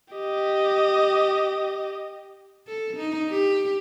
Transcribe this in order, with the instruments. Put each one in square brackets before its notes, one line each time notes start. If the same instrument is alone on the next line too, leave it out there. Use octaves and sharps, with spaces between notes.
[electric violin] G4 D#5
[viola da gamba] A4
D#4
G4